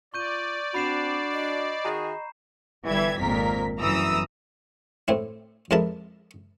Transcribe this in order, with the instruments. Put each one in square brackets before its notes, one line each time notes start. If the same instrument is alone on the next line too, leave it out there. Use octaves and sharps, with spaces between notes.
[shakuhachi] F4 [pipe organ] D5 [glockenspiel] C#6 G6 D#7
[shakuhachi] C4 [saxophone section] D4 F#4 [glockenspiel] B5 C7 E7
[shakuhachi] D#5
[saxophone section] D#3 F#4 G#4 [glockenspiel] A#5
[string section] G1 E3 G3 E5 G#6
G#1 F2 A#2 A#4 B6
G1 F#2 E3 A#5 D#6 E6
[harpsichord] A2 C4 E4
F2 G#3 E4 A#4 A5 B5